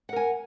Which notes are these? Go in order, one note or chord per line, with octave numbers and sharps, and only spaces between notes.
A#4 F#5 G#5